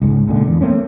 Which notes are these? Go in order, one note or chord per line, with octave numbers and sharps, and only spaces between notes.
C#2 G#2
C#2 A#2 D3
E2
A3 A#3 C4 C#4